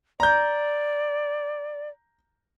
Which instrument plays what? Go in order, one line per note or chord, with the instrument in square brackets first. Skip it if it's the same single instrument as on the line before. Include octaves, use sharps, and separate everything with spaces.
[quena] D5 [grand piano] A#5 G6